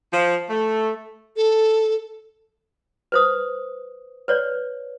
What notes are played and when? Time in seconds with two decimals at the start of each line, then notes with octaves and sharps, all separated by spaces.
0.13 F3
0.50 A3
1.36 A4
3.12 B4 C5 D#6
4.28 B4 C#5 D5